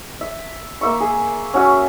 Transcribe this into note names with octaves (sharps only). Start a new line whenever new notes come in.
E5
A#3 E5 C#6
G#4
C#4 F#4 E5